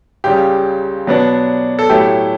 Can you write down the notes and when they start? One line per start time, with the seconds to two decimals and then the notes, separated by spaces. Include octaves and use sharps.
0.24 C#2 C#3 G3 G4
1.07 B2 F#3 B3 D4
1.79 A4
1.89 A2 F#3 A3 E4 G4